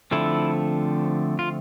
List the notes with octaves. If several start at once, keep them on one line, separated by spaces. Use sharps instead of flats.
D3 F3 A3 C4 E4
F4